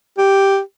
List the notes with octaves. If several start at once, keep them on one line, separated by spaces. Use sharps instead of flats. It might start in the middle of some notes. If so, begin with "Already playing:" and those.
G4